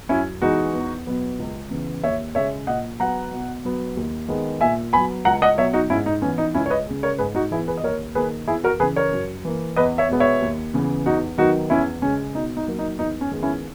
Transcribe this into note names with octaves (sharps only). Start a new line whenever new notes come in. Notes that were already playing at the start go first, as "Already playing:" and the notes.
F#2 C#4 E4
E3 G#3 B3 D#4 F#4
E2
B2 F#3 B3
C#2
C#3 E3 B3
D#2 C#5 E5
C#3 G#3 C#5 E5
A#2 D#5 F#5
F#3 B3 F#5 A#5
B2
F#3 B3
D#2
D#3 G#3 B3
A#2 E5 G#5
F#3 B3 G#5 B5
C#2 F#5 A#5
D#5 F#5
B2 F#3 C#5 E5
D#4 F#4
G#2 C#4 E4
D#4
E3 B3 C#4
D#4
C#2 C#4 E4
C#5
B4 D#5
C#3 G#3
A#4 C#5
G#2 G#4 B4
D#4 F#4
E3 B3 E4 G#4
G#4 B4
D#5
D#2 A#4 C#5
D#3 A#3 G#4 B4
E2 E4 G#4
F#4 A#4
C#3 E3 G#4 B4
A#4 C#5
F#2
E3 A#3
E2 B4 D#5
C#5 E5
B2 G#3 B3
C#5 E5
D#2
C#3 E3 B3
E2 D#4 F#4
D#3 F#3 B3 D#4 F#4
E2 C#4 E4
C#3 G#3 C#4
B2 D#4
D#4
F#3 A#3
D#4
E2 D#4
C#4
D#3 G#3 B3
C#4 E4